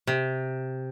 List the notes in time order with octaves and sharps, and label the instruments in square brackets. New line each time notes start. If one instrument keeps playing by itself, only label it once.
[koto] C3